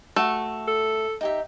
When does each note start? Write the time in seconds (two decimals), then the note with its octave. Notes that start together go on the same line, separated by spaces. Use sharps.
0.16 A3 F#4
0.67 A4
1.21 D#4 G4 E5